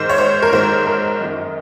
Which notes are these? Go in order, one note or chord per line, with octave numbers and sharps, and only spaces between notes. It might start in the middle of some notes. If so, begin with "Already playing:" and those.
Already playing: G#2 D#3 C5
C#5
C5
A#4
G#2 D#3 C5
A#4
F#2 D#3